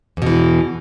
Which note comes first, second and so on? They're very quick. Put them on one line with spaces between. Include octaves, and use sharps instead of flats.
E2 B2 E3